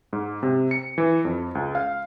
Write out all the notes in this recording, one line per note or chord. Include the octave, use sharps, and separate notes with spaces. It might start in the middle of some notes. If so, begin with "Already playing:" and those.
G#2
C3
C#7
E3
F2
C#2
F5